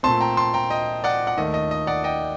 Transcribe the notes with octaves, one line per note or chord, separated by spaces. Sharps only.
A#2 A3 C4 A5 C6
G5 A#5
A5 C6
G5 A#5
D#5 G5
D5 F#5
F#5
D#2 D#3 A3 D#5
D#5
D#5
D5 F#5
D#5 G5